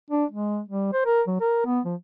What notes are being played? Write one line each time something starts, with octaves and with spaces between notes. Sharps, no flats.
D4
G#3
G3
C5
A#4
F#3
A#4
B3
F3